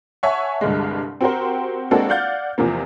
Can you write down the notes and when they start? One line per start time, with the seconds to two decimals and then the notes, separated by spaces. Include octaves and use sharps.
0.23 C#5 E5 F#5 G#5 A5 C#6
0.61 C2 G2 D3 G#3
1.21 C4 F#4 G4 A#4 C5
1.91 G#3 A#3 C4 D4 F#4 A4
2.09 D5 F5 F#5 F6 G6 A6
2.58 E2 C3 F3 A#3